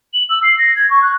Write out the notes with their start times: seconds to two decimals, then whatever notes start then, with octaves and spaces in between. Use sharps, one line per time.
0.14 F#7
0.30 E6
0.43 C7
0.58 A#6
0.76 G#6
0.90 C#6
1.02 F#6